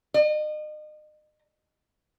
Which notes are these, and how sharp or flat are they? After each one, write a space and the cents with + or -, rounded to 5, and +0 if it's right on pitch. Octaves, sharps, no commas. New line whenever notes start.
D#5 -35